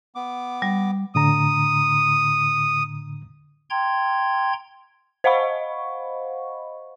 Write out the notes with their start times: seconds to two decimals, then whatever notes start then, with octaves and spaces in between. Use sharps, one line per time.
0.15 B3 D6
0.62 G3
1.15 A2 D3 A#5 D#6
3.70 G5 A#5 C6 G#6
5.24 C5 D#5 F5 F#5 B5 C#6